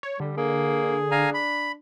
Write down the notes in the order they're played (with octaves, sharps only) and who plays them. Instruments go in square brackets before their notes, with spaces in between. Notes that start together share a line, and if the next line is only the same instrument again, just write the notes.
[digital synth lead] C#5
[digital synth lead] D3 [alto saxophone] G3
[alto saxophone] A#3 [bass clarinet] G#4
[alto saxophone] D4 [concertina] F5 G#5 A#5
[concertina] B5